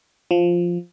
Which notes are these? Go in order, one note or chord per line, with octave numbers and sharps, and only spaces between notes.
F3